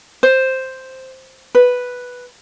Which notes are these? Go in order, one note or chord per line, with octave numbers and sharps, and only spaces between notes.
C5
B4